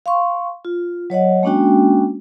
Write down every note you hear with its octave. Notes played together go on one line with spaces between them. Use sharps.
F5 C6 C#6
F4
F#3 C#5 D#5 F#5
G#3 A#3 C#4 D4 F#4 G5